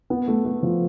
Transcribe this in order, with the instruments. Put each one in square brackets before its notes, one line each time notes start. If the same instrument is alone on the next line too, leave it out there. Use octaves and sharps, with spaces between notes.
[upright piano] B3
A3
A3
F3